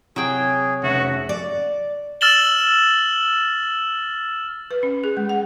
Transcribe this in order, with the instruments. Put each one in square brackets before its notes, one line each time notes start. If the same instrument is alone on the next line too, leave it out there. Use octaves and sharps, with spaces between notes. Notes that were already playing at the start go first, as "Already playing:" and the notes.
[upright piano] C3 [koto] F#3 G5 [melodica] G#4
[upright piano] F1 C#3 [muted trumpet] F#4 [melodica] E5
[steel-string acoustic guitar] D5
[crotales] E6 F6 A6 E7 F#7 G7
[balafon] B4
C#4
G#4
G#3
F#5